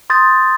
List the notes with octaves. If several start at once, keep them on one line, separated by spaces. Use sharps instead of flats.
C6 D#6 G6 A6